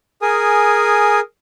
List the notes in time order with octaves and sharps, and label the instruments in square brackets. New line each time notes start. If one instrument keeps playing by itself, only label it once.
[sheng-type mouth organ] G#4 A#4 G#5 D#6